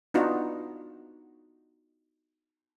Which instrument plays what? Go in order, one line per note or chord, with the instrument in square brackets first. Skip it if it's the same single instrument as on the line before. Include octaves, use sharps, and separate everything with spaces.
[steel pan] B3 D4 D#4 F4 F#4